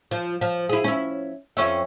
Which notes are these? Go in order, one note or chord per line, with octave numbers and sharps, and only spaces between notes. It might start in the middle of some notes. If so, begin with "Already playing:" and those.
F3
F3
E4 G#4
C#4 E4
F2 C#4 E5